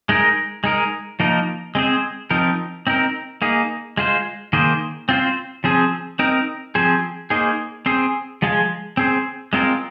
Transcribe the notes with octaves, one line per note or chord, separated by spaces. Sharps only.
G#3 D#4 A#4
G#3 D#4 A#4
F3 A#3 D#4 A#4
G#3 C4 G#4 C5
F3 C4 D#4 A#4
C4 D#4 A#4
A#3 D#4 G#4
G#3 F4 C5
D#3 A#3 G#4 C5
C4 F4 C5
F3 C4 G#4 C5
C4 D#4 A#4
F3 C4 G#4 C5
A#3 D#4 G#4 C5
C4 G#4 C5
F3 G#3 F4 G#4
C4 G#4 C5
G#3 C4 F4 A#4